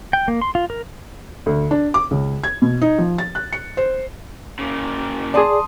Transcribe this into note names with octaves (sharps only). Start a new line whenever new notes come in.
G5
A#3
C6
F4
A#4
D2
D4
D6
C#2
G#6
B2
D#4
F3
A6
F#6
C#7
C5
C#3 A#3
G#4 D5 A5 C6 D#6